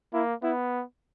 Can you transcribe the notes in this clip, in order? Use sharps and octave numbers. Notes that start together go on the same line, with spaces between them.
A#3 E4
B3 E4